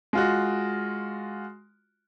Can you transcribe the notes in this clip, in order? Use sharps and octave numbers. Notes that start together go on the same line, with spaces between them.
G#3 F4 F#4